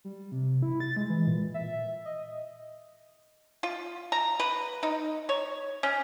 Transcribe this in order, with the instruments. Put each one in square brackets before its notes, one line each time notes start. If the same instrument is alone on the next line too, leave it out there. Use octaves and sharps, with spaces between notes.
[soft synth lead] G3
C3
E4
A6
G#3
E3
A#2
E5
D#5
[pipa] F4
A#5
B4
D#4
C#5
C#4